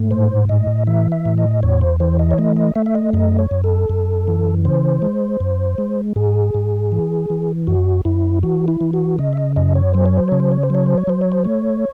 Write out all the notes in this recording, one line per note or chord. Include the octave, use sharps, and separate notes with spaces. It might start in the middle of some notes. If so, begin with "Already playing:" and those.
Already playing: G#2 A3
A2 C5
A2 D#5
E3 E5
E5
A2
D#5
E2 C#5
C5
E3 C5
D#5
C#5
A3 D#5
D#5
A3 E5
E5
D#5
F#2 D#5
C#5
F#2
A4
F#2
E3
C#3 C5
G#3
F#2
G#3
G#2 G#4
G#2
E3
E3
F#2 F#4
F#2 E4
E3 F#4
E4
E3
F#4
C#3 D#5
E5
D#5
F#2 D#5
C#5
F#3 C5
C#5
C5
C#3 C#5
C5
C#5
C5
F#3 C#5
C5
C#5
F#3 C5
C#5
C5
A3 C#5